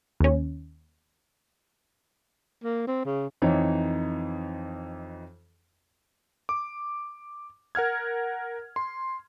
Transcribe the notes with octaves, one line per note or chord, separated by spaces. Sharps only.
D#2 C#4
A#3
C4
C#3
F2 E3 D#4 C#5
D6
A#4 F#5 F6 G#6
C6